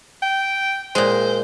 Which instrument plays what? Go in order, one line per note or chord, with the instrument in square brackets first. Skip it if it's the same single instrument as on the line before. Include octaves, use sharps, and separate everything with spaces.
[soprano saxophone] G5
[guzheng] A#2 G#3 [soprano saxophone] C5